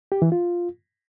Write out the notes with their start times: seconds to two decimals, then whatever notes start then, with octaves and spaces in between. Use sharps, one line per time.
0.12 G4
0.22 E3
0.32 F4